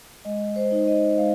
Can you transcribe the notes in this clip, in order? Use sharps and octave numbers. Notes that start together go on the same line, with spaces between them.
G#3 D#5
C5
D#4
D#5
G#3 F5